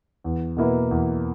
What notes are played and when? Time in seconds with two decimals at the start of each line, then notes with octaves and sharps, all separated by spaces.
0.24 E2
0.57 B2 A#3 E4 B4
0.91 E2